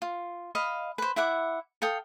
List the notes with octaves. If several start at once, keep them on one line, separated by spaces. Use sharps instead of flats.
F4
D#5 F5 B5
B4 C5
E4 E5 F#5 D6
A4 F5 G5 D#6